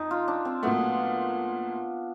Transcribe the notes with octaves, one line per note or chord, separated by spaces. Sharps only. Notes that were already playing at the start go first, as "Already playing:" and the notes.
Already playing: F2 D#4
F4
D4
C4
A#2 F#3 A3 B3